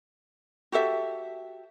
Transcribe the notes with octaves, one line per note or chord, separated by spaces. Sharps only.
F#4 G4 A4 E5